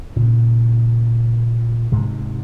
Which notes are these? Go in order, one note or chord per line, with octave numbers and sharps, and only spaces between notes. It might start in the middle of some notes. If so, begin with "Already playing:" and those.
A#2 C#3
G#2 C3